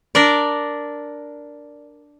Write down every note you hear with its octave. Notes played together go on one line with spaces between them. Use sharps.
D4 A#4 D5